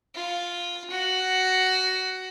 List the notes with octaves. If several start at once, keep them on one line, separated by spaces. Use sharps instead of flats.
F4
F#4